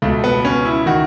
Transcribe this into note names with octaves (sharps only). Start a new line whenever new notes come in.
C#2 B2 A3
B3
C#4
E4
D#3 F#4